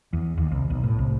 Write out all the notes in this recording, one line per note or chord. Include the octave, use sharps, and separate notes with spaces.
E2
D#2
C2
B1
A2
C2